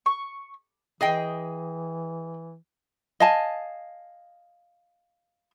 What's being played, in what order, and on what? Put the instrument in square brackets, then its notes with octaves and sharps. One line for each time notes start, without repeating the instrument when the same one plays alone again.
[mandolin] C#6
[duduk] E3 [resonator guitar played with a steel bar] G#4 D#5 G5
[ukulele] D#5 F5 G#5 A5